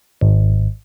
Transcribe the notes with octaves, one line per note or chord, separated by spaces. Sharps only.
G#1